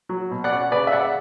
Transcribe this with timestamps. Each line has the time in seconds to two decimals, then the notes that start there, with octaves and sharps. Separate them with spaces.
0.09 F#3
0.31 B2
0.44 D5 F#5
0.51 C#4
0.72 C#3 B4 D5
0.87 E5
0.92 C#3 D5 F#5